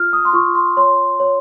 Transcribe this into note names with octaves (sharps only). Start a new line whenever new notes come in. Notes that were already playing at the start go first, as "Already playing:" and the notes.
Already playing: F4 F6
D#6
C6
F4 C#6
C6
C#5 C6
C#5